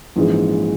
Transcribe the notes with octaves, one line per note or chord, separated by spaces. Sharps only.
A#1 G#2 E3 G#3 C#4